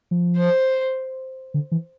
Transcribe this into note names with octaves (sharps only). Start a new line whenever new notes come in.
F3
C5
D3
E3